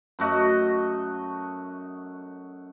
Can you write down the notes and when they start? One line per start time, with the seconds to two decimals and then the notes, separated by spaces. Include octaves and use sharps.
0.19 F#2 A3 F#4 D#5